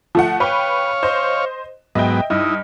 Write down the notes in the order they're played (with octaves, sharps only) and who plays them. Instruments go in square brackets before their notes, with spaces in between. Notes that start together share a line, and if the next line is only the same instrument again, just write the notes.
[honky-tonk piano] F3 A3 F#5
[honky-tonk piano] B4 G5 C#6 [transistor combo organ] C#5 F5
[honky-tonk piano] C5 D#5
[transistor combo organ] G#2 F#3 B3 [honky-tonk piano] D#5 E5 G5
[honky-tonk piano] G2 D#5 [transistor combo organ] D#4 E4